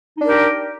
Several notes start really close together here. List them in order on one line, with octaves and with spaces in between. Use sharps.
D#4 D4 A#4 G4